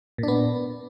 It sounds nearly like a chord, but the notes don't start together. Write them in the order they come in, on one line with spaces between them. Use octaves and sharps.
A#2 D4 B3